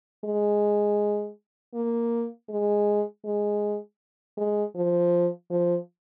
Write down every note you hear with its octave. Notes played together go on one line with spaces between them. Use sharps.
G#3
A#3
G#3
G#3
G#3
F3
F3